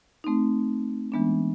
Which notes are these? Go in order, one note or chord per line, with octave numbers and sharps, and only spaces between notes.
A3 C4 D#4
E3 G#3 B3 D4